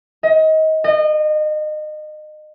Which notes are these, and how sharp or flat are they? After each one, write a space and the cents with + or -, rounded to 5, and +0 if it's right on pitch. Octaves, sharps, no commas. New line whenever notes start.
D#5 +25
D#5 -30